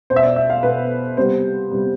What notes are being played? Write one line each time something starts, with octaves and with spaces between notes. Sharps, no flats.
B2 B3 C5
E5
D5
E5
F5
B2 B3 B4
C3 G3 B3 C5
C3 G3 B3